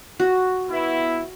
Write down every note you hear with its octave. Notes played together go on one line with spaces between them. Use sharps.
F#4
B3 E4